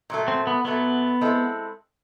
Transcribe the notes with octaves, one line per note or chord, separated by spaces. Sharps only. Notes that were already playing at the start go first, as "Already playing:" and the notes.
A#2 F#3 A3
C4
B3
A#2 F#3 A3 B3
G#3 C4 E4 A4